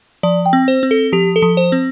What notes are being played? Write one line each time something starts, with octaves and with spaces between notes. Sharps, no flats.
F3 D5
G5
C4
C5
C4
A4
F3 G4
A4
F3
C5
C4